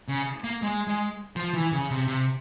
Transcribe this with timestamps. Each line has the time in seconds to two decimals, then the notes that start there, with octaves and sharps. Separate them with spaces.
0.08 C#3
0.44 A#3
0.62 G#3
0.88 G#3
1.36 F3
1.54 E3
1.72 C#3
1.91 C3
2.08 C3